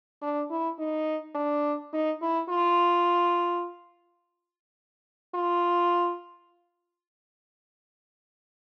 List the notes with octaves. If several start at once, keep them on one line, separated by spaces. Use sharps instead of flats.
D4
E4
D#4
D4
D#4
E4
F4
F4